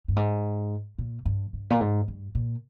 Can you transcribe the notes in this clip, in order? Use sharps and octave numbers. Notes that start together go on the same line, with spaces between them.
G2
G#2
A#2
G2
G2
A#2
G#2
G2
A#2